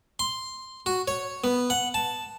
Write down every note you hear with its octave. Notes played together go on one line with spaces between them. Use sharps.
C6
F#4
C#5
B3
F#5
A5